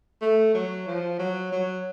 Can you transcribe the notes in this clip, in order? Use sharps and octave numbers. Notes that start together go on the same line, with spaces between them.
A3
F#3
F3
F#3
F#3